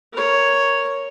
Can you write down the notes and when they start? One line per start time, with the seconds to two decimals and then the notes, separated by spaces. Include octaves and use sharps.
0.13 A#4 C#5